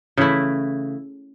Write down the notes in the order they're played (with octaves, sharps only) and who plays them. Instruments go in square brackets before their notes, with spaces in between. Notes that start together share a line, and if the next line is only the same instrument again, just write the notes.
[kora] C#3 E3 A3 E4